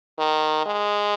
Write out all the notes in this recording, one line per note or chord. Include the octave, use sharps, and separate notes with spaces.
D#3
G#3